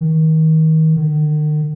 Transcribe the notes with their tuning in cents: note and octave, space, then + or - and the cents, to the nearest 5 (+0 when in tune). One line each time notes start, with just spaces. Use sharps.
D#3 +30
D#3 -45